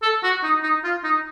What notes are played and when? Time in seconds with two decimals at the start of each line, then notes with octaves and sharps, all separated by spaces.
0.02 A4
0.23 F#4
0.43 D#4
0.63 D#4
0.84 F4
1.04 D#4